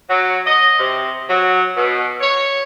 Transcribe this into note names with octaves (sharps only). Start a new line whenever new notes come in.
F#3
D#5
C3
F#3
B2
C#5